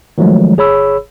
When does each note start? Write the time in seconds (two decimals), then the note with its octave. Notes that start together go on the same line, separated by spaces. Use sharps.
0.18 D#3 F3 F#3 G#3 A3
0.57 G1 G#4 C#5 B5 E6